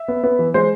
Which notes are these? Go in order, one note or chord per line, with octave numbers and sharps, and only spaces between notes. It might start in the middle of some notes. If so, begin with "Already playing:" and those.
Already playing: E5
B3
B3
E3
G#3 C5